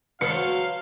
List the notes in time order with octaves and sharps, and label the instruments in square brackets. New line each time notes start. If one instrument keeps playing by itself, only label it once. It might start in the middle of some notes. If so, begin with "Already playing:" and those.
[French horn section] F#3 [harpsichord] B4 C5 A5 [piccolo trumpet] F5 [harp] C#7